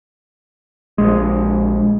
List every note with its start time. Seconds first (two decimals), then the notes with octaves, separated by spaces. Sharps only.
0.98 A#1 G#3